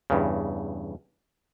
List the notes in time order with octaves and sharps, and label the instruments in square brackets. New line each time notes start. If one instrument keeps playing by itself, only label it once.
[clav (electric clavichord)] E2 G2 C#3